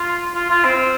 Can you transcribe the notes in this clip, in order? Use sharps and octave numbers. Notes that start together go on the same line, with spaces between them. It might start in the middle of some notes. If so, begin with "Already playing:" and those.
Already playing: F4
F4
F4
C4